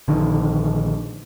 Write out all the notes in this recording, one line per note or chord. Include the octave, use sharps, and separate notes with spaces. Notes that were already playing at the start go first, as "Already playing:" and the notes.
A#1 D3 D#3